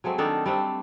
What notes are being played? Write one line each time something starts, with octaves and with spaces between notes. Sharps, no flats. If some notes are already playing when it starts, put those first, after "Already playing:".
F#3 G#3 A3 C4
D#3 D4 D#4 A4
G3 A3 C4 D4